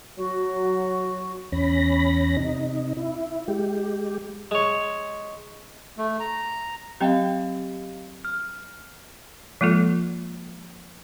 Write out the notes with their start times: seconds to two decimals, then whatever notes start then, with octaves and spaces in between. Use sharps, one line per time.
0.17 F#3 F#4
1.52 E2 C#4 B5 A#6
2.37 C3 D#4
2.97 E4
3.48 G#3 G4
4.51 G#3 C#5
5.98 A3
6.20 A#5
7.01 F#3 C4 G4 D#5 F5 G5
8.25 F6
9.61 F3 G#3 A#3 F4 A4